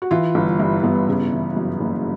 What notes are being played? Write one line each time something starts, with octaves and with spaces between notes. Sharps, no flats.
F#4
E3 F4
G1
G2 E4
G1 B3
C#3
E3
F#2
F#1